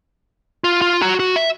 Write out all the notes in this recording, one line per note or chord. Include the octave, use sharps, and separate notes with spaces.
F4
F4
F#4 A#5
F#4
E5